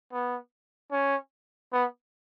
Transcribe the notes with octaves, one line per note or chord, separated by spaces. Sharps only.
B3
C#4
B3